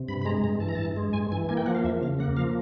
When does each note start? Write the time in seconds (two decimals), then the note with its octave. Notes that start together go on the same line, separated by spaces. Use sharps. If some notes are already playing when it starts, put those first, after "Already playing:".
Already playing: C3
0.08 G2 B5
0.22 B5
0.25 G#3 A#5
0.44 G2 A#5
0.60 E3 A5
0.68 A#5
0.75 G2 A5
0.96 G#3
1.13 G2 G#5
1.32 E3 G#5
1.49 A#3 G#5
1.57 G5
1.66 F3 F#5
1.75 F5
1.84 E2 E5
2.01 C#3 F5
2.19 A#3 F#5
2.37 F3 F5